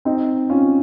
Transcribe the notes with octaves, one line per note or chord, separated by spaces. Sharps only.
C4 D#4
C#4 F4